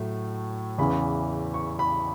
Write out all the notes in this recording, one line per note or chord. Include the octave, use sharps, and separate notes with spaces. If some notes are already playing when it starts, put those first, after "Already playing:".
Already playing: A2 F#3 A3
E2 C#3 E3 B5
C#6
B5